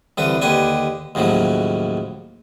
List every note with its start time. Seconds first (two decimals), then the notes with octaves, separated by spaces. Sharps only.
0.18 C2 D3 E3 B4
0.42 D#2 D3 G4 B4 G#5
1.15 D#2 A2 C#3 F3 F#3